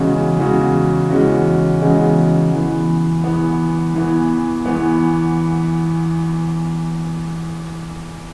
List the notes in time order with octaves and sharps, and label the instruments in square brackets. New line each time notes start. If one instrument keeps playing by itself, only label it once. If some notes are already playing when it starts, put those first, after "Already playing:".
Already playing: [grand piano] E2 C#3 G#3 C#4 F#4
E2 C#3 G#3 C#4 F#4
E2 C#3 G#3 C#4 F#4
E2 C#3 G#3 C#4 F#4
E2 E3 B3
E2 E3 B3
E2 E3 B3
E2 E3 B3